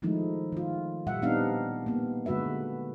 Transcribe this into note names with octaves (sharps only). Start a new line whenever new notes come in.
D#3 F3 G#3 A3 D#4 E4
D#3 F4
A#2 G3 E5 F#5
G3 B3 C4 D4 D#4 F5
A#3 B3
D3 G#3 F#4 B4 E5